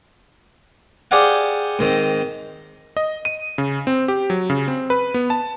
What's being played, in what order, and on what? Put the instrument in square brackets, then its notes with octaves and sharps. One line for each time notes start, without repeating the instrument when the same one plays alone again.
[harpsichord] G4 G#4 C5 D5 F5 F#5
G#2 D#3 C4
[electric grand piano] D#5
D#7
C#3
C4
G4
F#3
C#3
C4
B4
B3
A5